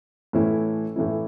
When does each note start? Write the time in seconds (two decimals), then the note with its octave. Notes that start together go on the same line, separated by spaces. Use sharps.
0.33 A2 E3 A3 C#4 E4
0.96 A2 E3 A3 C#4 E4